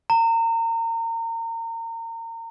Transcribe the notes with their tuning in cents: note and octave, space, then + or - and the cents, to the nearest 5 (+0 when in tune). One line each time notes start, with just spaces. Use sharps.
A#5 -30